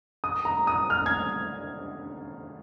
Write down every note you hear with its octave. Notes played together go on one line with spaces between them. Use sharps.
D#6
A#5
D#6
F6
G#6